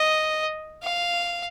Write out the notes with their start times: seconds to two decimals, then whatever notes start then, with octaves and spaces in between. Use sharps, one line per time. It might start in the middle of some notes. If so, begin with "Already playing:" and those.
Already playing: D#5
0.84 F5